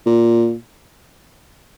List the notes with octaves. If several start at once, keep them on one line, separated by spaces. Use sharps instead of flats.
A#2